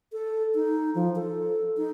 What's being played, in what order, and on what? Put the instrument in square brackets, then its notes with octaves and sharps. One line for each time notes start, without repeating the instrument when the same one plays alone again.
[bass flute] A4
D#4
F3
A4
D#4